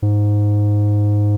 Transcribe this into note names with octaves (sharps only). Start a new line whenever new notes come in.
G#2